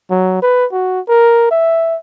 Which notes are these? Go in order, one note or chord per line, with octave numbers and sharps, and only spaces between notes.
F#3
B4
F#4
A#4
E5